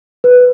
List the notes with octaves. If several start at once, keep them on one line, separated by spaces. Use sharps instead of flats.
B4